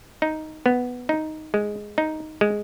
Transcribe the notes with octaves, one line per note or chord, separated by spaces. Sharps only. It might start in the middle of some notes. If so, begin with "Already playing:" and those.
D#4
B3
D#4
G#3
D#4
G#3